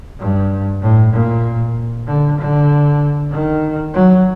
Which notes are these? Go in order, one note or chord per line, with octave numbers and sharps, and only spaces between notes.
G2
A2
A#2
D3
D3
D#3
F#3